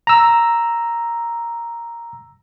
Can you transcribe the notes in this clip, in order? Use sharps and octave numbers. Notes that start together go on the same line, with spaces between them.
A#5 E6